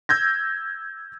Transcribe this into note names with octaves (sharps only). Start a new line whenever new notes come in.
E6 G6 G#6 A#6